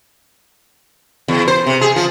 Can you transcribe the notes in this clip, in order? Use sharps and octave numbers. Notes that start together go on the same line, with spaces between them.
E2
C5
C3
G#4
F3